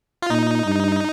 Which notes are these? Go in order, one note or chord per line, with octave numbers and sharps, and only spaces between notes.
F4
A#2 D#4
G2